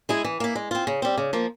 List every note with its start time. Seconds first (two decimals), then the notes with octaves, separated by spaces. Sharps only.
0.09 G#3 E4 G#4
0.24 E3
0.40 A#3 E4
0.55 G#3
0.71 C4 F4
0.87 C#3
1.02 G3 C4
1.18 C#3
1.33 F3 A#3